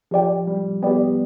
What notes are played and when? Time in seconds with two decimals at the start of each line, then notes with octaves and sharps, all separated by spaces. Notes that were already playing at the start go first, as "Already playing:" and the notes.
0.11 F3 G4 D5 G5
0.47 G3
0.82 B3 G4 D5 G5